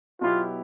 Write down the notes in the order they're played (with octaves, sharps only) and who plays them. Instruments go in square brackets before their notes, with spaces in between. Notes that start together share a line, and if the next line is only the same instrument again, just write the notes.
[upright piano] B2 F#3 B3 E4 G4 [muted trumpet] F4